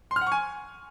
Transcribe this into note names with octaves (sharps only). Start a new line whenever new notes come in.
C6
F6
F#5
C#6
G#5